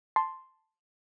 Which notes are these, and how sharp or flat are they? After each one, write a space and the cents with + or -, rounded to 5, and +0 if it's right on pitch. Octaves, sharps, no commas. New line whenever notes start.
A5 +0 C6 +0